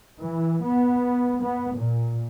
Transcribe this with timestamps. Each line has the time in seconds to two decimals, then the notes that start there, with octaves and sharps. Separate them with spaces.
0.20 E3
0.65 B3
1.42 B3
1.76 A#2